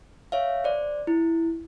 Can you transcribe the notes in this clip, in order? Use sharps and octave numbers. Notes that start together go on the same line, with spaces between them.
C#5 E5 F5
C5 D5
E4